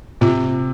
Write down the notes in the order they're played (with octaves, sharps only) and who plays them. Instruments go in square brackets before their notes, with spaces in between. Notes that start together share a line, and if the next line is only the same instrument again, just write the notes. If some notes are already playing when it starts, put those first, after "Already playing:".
[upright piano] C3 [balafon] F4